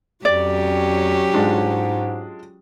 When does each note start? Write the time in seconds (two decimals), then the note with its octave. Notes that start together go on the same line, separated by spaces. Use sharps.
0.25 F2 F#3 C#4 G4 D5
1.34 G#2 G#3 D4 F4